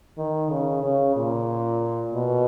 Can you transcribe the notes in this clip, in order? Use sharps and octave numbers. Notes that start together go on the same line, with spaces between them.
D#3
C#3
C#3
A#2
B2